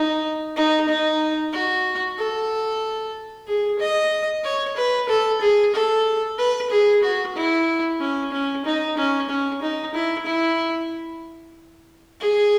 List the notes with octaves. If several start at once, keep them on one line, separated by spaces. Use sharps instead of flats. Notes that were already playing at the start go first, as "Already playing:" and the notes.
Already playing: D#4
D#4
D#4
F#4
A4
G#4
D#5
C#5
B4
A4
G#4
A4
B4
G#4
F#4
E4
C#4
C#4
D#4
C#4
C#4
D#4
E4
E4
G#4